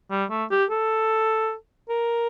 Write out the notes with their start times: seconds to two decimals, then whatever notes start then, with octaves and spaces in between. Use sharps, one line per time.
0.11 G3
0.30 A3
0.51 G4
0.71 A4
1.89 A#4